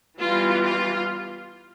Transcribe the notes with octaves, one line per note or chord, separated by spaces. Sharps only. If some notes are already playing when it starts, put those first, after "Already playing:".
E3 G3 B3 F4
F4